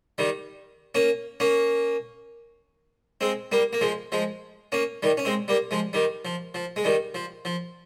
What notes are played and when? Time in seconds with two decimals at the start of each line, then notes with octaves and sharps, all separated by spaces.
0.18 D#3 G3
0.95 A#3 C#4
1.40 A#3 C#4
3.21 G#3 C4
3.52 G3 A#3
3.73 A#3
3.81 F3 G#3
4.12 F3 G#3
4.72 A#3 C#4
5.03 D#3 G3
5.17 C#4
5.25 G#3 C4
5.48 G3 A#3
5.71 F3 G#3
5.93 D#3 G3
6.25 F3
6.55 F3
6.76 G#3
6.84 D#3 G3
7.15 F3
7.45 F3